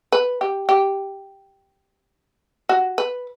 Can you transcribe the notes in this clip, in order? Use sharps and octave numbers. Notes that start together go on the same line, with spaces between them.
B4
G4
G4
F#4
B4